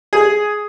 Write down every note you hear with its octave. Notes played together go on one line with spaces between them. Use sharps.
G#4